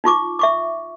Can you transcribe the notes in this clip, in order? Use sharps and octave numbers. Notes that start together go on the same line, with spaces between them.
D#4 F4 C#6 D6
E5 C#6 D6